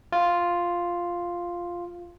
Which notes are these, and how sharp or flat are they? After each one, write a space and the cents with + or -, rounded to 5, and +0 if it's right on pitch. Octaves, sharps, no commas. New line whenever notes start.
F4 +0